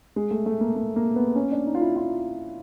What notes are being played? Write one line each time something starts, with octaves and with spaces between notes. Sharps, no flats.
G#3
A3
A3
A#3
A#3
A#3
B3
C#4
D4
D#4
F4
E4
F4